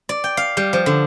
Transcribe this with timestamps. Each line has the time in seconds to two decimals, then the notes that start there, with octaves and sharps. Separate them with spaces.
0.09 D5
0.24 G5
0.37 F5
0.57 G3
0.73 F3
0.86 D3